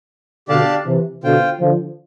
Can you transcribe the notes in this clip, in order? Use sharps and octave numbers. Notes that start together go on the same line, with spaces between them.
B2 D3 D4 G4 D5 F5 A5
C3 E3
B2 D3 F4 C5 G5
D3 F3